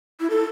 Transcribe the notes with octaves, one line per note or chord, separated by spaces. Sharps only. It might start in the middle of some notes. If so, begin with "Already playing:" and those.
E4
A4